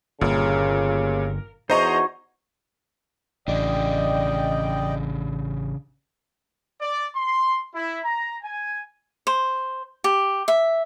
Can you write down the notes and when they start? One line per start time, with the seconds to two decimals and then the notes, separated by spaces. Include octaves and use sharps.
0.21 G1 A#2 C#3 A#4
1.70 E2 D#4 F#4 C5 C#5 D#5 A#5
3.48 A1 C#3 D4 D5 D#5 G5
6.80 D5
7.15 C6
7.73 E4
8.04 A#5
8.43 G#5
9.27 C5
10.04 G4
10.48 E5